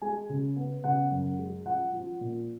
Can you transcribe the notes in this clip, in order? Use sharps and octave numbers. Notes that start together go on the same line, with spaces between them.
G#3 G#5
C#3
B3
C#3 F#5
F#2
G#3
F3 F#5
F3
A#2